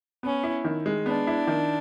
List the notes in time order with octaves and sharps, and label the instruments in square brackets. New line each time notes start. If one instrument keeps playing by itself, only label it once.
[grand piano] B3 [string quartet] C#4
[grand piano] E4
D#3
G#3
[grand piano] B3 [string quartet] D4
[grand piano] E4
D#3